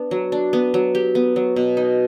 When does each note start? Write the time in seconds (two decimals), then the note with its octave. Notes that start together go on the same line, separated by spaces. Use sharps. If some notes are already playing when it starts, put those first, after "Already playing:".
Already playing: B3 D4
0.11 F#3
0.32 D4
0.53 B3
0.74 F#3
0.95 G4
1.15 B3
1.36 F#3
1.56 B2
1.77 D#4